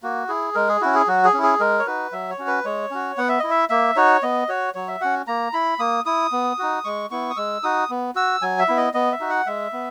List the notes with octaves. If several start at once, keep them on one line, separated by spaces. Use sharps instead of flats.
A#3 F#4
E4 G#4
G#3 A#4
G#4
C#4 E4 F#4
G#4
F#3 F#4
G#4
C#4 E4
G#4
G#3 A#4
C#5
D#4 F#4 B4
F#3 E5
C#5
C#4 F#4
B4
G#3 C#5
C#4 F#4
B3 F#5
E5
E4 D#5
E5
A#3 E5
D#4 F#4 C#5
B3 D#5
F#4 C#5
F#3 C#5
E5
C#4 F#4 F#5
A#3 A#5
E4 B5
A#3 D#6
E4 D#6
B3
D#4 F#4
G#3 C#6
B3 E4 C#6
D#6
G#3 E6
D#4 F#4 D#6
B3
F#4 E6
F#3 G#5
E5
B3 E4
D#5
B3 D#5
E5
D#4 F#4
F#5
G#3 E5
B3